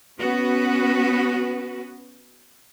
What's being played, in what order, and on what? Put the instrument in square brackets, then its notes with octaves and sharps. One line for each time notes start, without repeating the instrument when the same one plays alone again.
[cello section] B3 C#4 F#4 B4